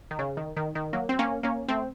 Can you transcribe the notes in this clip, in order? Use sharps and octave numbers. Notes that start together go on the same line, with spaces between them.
D#3
C#3
D#3
D#3
D#3
F#3 A#3
C4
A#3 C#4
A#3 C#4
A3 C4